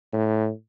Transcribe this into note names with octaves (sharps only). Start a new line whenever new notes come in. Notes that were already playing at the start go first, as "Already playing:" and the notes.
A2